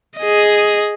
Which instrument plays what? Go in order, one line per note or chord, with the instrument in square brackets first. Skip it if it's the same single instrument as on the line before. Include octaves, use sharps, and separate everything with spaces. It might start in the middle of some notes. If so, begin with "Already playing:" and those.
[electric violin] G#4 D#5